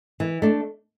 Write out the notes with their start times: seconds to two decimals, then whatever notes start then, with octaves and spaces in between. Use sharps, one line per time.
0.20 E3
0.42 A3 D4